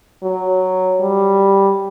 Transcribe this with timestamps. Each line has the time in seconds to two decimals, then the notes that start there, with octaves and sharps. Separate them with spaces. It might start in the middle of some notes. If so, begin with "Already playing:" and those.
0.23 F#3
1.01 G3